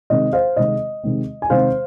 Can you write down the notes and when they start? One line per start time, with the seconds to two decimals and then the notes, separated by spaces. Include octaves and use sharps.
0.10 C3 D#3 G#3 C4 D#5
0.33 C5 F5
0.57 C3 D#3 G#3 C4 D#5
1.03 C3 D#3 G#3 C4
1.42 G#5
1.50 C3 D#3 G#3 C4 C5 F5